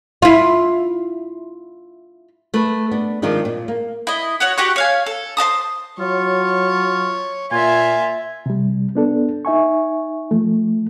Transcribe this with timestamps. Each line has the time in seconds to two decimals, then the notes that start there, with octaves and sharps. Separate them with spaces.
0.22 E4 F4
2.54 A3 B4
2.91 B3 D4
3.22 D#3 F3 G#3 C4 D4 D#4
3.45 A#2
3.68 A#3
4.07 E4 D#5
4.40 F#4 C#5 F#5
4.57 F#4 G4 F#5 C#6
4.76 C#5 F5 G#5
5.06 A4
5.37 C5 D#5 A5 D#6
5.99 F#3 F4 C#5
7.51 A#2 F4 E5 G#5
8.46 C3 G3
8.95 B3 D4 A4
9.45 D#4 E5 G#5 C#6
10.31 F3 A3